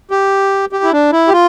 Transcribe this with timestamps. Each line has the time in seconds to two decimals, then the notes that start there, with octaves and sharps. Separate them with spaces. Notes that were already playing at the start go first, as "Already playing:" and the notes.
0.11 G4
0.72 G4
0.84 E4
0.93 D4
1.12 E4
1.28 G4
1.33 F4